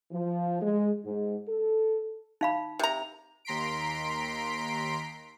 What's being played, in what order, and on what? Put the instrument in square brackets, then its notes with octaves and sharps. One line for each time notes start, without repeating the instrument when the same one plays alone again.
[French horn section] F3
G#3
G#2
A4
[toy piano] D#4 F5 B5
[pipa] C3 A#5
[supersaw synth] D#2 A#5 C6 B6 D7